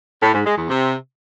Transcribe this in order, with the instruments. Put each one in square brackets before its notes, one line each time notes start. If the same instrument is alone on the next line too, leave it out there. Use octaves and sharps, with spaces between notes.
[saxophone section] A2
G#2
G#3
E2
C3